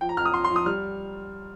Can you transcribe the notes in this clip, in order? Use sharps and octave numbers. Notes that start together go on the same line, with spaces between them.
F3 G5
A#5
F2 F6
D#6
F2 C6
C6
F3
D#6
G3 F6